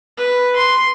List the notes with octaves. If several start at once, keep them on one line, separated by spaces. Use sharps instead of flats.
B4
C6